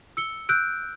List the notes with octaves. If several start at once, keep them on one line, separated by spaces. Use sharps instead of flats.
E6 C#7 G7
E6 F#6 G6 D7